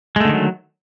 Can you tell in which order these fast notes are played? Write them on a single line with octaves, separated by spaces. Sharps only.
G#3 A3 D3 D#3 F#3